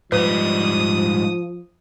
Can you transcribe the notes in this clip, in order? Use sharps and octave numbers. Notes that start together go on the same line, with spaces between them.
G#2 F3 G3 B4 D#6